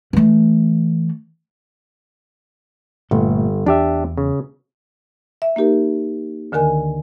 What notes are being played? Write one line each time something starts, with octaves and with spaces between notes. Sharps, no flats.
E3 A3
G1 A#2 A3
E2 D4 G4 E5
C#3
E5
A#3 D#4 G4 A#4
D2 D3 D#3 A#4 G#5